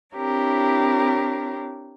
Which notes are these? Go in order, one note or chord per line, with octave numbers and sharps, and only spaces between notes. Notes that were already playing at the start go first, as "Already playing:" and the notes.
C4 D4 E4 G4 A#4 C#5